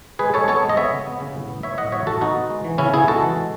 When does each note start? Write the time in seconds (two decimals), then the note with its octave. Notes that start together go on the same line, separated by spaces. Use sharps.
0.19 G#3 G#4 B4
0.34 G#3 A4 C#5
0.48 B3 A4 C#5
0.63 G#3
0.69 D#5
0.77 B3 C#5 E5
0.92 C#3
1.07 B3
1.20 C#3
1.35 A2
1.49 B3
1.63 B3 C#5 E5
1.78 A2 D#5 F#5
1.92 F#3 C#5 E5
2.06 A2 F#4 A4
2.21 B3 D#4 F#4
2.35 B3
2.50 G#3
2.64 E3
2.78 C#3 C#4 E4
2.93 B3 E4 G#4
3.08 G#3 F#4 A4
3.23 E3
3.36 G#3